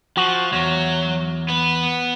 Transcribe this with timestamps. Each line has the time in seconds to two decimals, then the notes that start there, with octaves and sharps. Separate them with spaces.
0.17 F3 F#4
0.53 E2 F#3
1.48 B3 B4